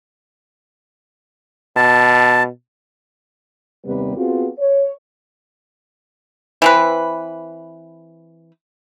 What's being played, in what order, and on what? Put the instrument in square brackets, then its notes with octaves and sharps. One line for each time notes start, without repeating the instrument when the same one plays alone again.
[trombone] B2 [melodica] A5
[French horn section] D#2 C3 G3 B3 B4
B3 C4 F4 F#4 G#4 A4
C#5
[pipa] E3 C4 B4